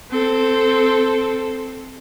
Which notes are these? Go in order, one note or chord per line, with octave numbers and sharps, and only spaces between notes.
C4 A4